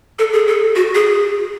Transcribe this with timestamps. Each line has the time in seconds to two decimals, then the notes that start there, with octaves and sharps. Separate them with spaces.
0.19 A4
0.33 G#4
0.48 A4
0.76 F#4
0.95 G#4